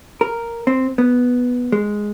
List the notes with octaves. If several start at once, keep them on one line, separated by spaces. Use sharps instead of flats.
A#4
C4
B3
G#3